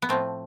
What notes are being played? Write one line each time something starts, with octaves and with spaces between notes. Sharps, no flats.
B3
A2 F3 A3 C4